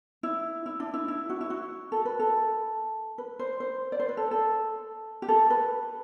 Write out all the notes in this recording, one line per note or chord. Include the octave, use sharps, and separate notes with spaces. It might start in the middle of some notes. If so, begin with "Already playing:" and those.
E4
E4
D4
E4
E4
F#4
E4
F#4
A4
B4
A4
B4
C5
C5
D5
C5
B4
A4
A4
G4
A4
B4